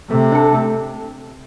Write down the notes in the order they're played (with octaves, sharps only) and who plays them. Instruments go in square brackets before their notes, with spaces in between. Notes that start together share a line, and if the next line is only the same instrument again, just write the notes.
[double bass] C3 [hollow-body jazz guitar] A3
[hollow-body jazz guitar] D4 A4
A3